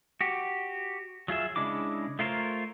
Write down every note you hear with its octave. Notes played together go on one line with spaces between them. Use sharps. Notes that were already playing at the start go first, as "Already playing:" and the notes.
F#4 G4
F#3 F4 G#4 E5
C#3 G#3 D4 E4 D6
A3 F4 A#4 C5 C#5